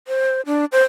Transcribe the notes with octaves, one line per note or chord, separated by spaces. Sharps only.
C5
D4
C5